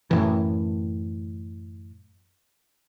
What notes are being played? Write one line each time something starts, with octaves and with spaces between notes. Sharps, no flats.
F#2 A2 E3